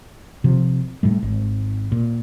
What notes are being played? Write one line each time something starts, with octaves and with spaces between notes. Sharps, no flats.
C3 F3
A2 G3 A3
G#1
A#2